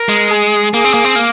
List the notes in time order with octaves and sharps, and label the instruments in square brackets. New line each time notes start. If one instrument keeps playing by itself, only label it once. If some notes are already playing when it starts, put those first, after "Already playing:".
Already playing: [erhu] A#4
[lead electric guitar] G#3
[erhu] G#4
[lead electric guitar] A#3 [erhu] G#4
[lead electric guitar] C4
A#3
C4
A#3